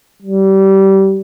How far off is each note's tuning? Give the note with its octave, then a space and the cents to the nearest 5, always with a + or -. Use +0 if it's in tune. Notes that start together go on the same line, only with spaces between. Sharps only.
G3 -25